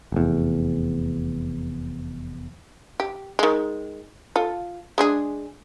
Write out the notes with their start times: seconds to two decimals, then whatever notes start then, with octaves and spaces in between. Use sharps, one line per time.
0.12 F1 E2
3.00 G4
3.39 D#3 G#3
4.36 F4 A4
4.98 G#3 D4 G#4